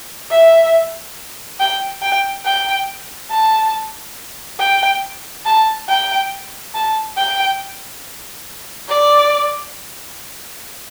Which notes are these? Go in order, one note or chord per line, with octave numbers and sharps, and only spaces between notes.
E5
G5
G5
G5
A5
G5
A5
G5
A5
G5
D5